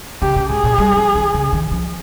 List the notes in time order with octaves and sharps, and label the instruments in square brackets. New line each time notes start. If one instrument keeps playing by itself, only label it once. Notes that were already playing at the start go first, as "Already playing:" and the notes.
[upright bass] C#3 [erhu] G4
[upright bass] C#3
[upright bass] G#2 [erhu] G#4
[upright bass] A#2
G3
F3
D#3
C#3
D#3
F3